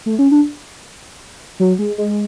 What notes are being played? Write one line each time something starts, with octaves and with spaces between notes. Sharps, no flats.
A3
C#4
D4
F#3
G#3
G#3